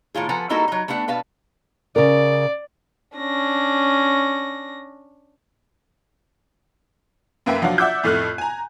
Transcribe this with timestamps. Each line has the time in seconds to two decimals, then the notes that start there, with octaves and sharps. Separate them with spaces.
0.15 A2 D#3 F4 G#4
0.29 F3 A4 B4 F#5 G#5 A#5
0.50 G3 A#3 D#4 E4 F#4 A4
0.68 F#3 D#4
0.88 A3 B3 D4 F#5
1.08 B2 B4 F5 A5
1.96 C#3 A#4 D5
3.17 C#4 D4 A#6
7.46 F#2 A#3 B4 E5 G5
7.62 F3 F#3 D4 F4 F#4
7.78 D5 E5 F#5 D6 E6 G6
8.04 F2 A2 A3 F6 F#6
8.38 G#5 A#5